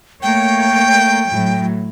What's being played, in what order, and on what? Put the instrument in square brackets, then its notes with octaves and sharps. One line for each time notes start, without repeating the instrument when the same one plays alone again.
[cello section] A3 A#3 C#5 [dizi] G5
[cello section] A2 F#3